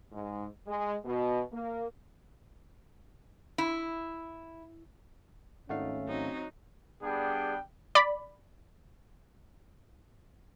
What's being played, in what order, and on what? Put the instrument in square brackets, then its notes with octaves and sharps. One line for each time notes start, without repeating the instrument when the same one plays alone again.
[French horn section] G#2
G#3
B2
A#3
[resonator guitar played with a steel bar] E4
[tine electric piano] G#1 A3 F5 [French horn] C#4 [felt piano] D#4 F#5
[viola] F#3 D#4 [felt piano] C4
[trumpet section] G3 B3 D4 G#4 G5
[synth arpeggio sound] D5 B5